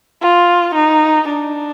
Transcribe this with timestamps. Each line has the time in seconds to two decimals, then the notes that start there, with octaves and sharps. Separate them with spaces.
0.22 F4
0.75 D#4
1.28 D4